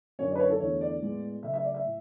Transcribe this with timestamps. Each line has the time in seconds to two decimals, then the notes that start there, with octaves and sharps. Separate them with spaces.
0.19 F#2 D3 F#3 C#4 C#5
0.30 D5
0.35 B4
0.39 C#5
0.50 A4
0.60 E2 D3 A3 D4 C#5
0.81 D5
1.01 A2 G#3 B3
1.43 C#3 F#3 A3 E5
1.53 E5
1.64 D5
1.74 E5
1.85 A2